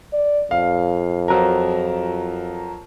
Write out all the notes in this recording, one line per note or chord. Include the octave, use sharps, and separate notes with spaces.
D5
F2 F5
F3 F#3 A#4